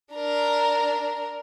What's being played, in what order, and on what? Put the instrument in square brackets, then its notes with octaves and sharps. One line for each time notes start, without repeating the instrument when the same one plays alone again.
[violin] D4 A#4